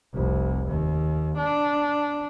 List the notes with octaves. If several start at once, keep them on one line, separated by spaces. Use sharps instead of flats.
F1 C2
D#2
D4